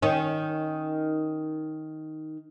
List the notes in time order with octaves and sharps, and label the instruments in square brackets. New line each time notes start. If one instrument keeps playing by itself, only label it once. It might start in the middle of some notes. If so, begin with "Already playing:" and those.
[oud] D#3 C#4